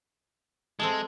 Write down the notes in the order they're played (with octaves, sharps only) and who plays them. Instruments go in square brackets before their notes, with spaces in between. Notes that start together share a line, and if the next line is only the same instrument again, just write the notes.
[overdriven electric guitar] G#3 [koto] C4 A4 A5